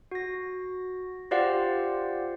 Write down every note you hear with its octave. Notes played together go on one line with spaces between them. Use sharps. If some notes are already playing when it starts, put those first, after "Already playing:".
F#4 A#6
F4 G4 C5 D5 F5 F#5